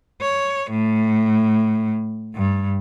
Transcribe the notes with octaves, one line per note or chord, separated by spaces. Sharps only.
C#5
A2
G2